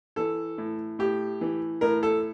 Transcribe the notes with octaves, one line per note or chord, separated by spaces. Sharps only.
E3 A4
A2
A2 G4
E3
A2 A#4
A4